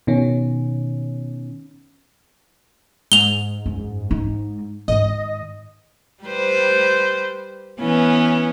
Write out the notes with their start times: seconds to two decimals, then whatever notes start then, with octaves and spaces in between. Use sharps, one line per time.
0.07 B2 D#3 C#4
3.12 G#2 F7 G7
3.66 F#2
4.11 D#4
4.88 G#2 D#3 D#5
6.23 G3 B4 C5
7.80 E3 B3 C#4